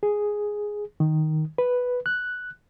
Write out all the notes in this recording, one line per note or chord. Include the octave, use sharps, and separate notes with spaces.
G#4
D#3
B4
F#6